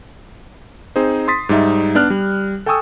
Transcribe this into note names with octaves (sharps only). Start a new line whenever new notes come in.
C4 D#4 G#4 C5
C6 D#6 A6 B6
G#2 G3 D#4 E5
B3 D4 D5 F6 F#6
G3
A4 G5 G#5 C#6 D#6 E6